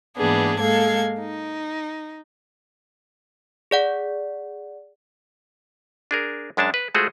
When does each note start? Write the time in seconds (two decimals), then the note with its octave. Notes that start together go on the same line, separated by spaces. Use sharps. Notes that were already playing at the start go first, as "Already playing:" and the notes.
0.16 G#2 E3 A#3 B3 D4 G#4
0.59 G#3 A#3 A4 F5 G#6
1.19 D#4
3.71 G#4 D5 F#5
6.11 D4 G#4 A#4
6.57 F#2 G#3 D4 C#5 A5
6.74 B4
6.95 G#3 A3 F4 F#4 G#4 C5